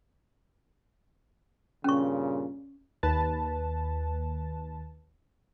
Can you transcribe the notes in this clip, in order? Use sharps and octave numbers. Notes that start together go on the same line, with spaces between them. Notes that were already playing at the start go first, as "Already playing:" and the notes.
G2 A#2 C#3 C#4 C#6
D#2 B4 A5